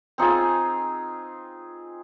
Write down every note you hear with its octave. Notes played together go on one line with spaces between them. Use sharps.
C4 D#4 F4 G#4